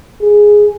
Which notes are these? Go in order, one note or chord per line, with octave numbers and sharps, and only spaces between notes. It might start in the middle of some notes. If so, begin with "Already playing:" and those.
G#4